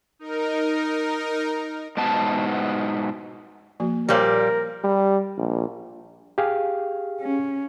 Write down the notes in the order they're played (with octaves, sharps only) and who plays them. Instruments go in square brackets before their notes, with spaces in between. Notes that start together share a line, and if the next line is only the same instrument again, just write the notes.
[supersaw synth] D#4 A#4
[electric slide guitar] G#2 B2 B3 A5
[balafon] F3 A#3 F#4
[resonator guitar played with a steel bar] A#2 G3 [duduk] A#4 [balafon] C5 C#5 F5
[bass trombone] G3
A#1
[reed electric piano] G4 G#4 F5
[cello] C#4